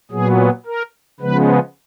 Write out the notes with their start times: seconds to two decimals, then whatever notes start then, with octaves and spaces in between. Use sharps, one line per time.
0.11 A#2 F#3 B3 G#4
0.66 A#4
1.20 C#3 F3 G#3 B3 B4